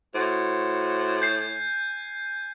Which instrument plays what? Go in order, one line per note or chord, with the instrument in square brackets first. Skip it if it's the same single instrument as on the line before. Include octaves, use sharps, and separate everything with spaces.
[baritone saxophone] A2 [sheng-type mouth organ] F#4 C5
[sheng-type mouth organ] G#5 [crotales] G6 C7